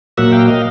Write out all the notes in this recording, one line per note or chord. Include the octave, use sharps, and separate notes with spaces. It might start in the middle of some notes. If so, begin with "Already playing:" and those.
A#2 F#3 A#3 E5 F#5
F5 G5
D#5 F5